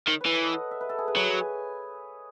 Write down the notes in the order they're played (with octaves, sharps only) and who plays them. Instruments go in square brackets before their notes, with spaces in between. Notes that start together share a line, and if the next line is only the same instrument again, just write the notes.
[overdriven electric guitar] D#3 [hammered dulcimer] C#5
[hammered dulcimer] B4
[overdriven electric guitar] E3
[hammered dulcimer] A4
D#5
F#5
E5
B4
A4
G#4
B4
[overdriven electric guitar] F#3 [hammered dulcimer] C#5
[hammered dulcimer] G#5